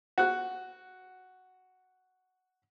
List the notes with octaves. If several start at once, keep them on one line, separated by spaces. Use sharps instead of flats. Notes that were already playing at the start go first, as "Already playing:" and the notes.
F#4 F#6